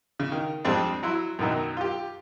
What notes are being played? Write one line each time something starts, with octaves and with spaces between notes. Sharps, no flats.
C#3
D#3
F2 G3 G#3 C4 D4
F#3 E4 C6
F#2 B2 D#3 F#3
F4 G4